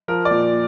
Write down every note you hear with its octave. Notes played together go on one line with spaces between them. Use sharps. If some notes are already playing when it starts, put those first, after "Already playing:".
F3 A#4
D5
A#2